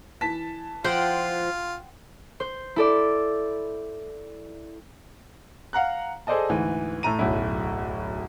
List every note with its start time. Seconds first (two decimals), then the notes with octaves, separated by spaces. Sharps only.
0.21 E3 A5 B6
0.84 F3 F4 F#5 G5 C6
2.40 C5
2.76 E4 A4 D5
5.73 F5 F#5 A#5 F#6
6.27 G#4 A4 C5 D5 D#5 A5
6.49 D2 G#2 E3
7.03 A2 A3 A#5 D#7
7.19 D1 B1 F#2 E4